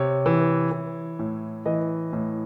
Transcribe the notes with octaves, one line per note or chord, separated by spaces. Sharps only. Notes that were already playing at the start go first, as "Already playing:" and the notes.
Already playing: C3 C#5
E3
E3
A2
E3 D#5
A2